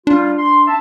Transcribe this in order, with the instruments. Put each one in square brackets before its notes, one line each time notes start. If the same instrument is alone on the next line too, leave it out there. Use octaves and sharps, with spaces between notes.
[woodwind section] G3 F4 [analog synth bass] D4
[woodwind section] C6
E5 A5